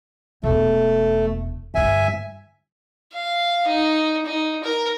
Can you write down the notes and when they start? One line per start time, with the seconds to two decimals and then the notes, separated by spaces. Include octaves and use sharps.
0.44 E1 A3
1.75 G2 D3 E5 G#5
3.13 F5
3.67 D#4
4.26 D#4
4.64 A#4